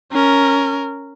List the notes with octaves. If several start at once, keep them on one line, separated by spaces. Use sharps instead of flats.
C#4 A#4